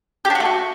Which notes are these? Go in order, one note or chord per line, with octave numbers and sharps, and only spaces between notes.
G4
D4
F#4
A3
F#4